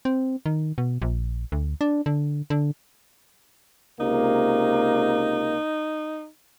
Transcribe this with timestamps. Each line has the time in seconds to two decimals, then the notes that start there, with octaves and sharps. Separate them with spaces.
0.05 C4
0.46 D#3
0.78 B2
1.02 A#1
1.52 D2
1.81 D4
2.06 D3
2.50 D3
4.00 C#2 C3 A#3 D#4